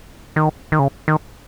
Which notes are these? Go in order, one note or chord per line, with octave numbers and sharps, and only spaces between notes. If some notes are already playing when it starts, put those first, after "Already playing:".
D#3
D#3
C#3
D#3